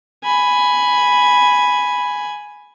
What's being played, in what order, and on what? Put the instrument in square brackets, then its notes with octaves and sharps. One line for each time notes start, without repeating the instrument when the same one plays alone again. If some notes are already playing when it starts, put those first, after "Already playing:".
[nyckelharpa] G#5 B5